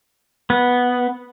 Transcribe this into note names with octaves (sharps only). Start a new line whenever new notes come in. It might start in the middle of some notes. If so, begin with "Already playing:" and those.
B3